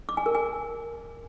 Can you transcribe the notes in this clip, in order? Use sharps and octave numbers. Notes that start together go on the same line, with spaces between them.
D6
G#5
A#4
G#5